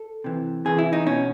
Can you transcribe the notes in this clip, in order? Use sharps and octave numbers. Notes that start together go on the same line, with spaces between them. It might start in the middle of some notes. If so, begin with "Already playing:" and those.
Already playing: A4
C3 E3
C3 E3 G#4
E4
D#4
B2 C#4